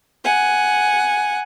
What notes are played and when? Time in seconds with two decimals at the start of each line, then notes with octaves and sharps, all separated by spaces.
0.24 F#5 G#5